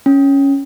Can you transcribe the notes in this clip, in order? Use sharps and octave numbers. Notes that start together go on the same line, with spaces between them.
C#4